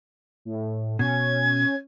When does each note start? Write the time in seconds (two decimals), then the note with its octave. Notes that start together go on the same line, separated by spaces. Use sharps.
0.45 A2
0.99 B2 C#4 G#6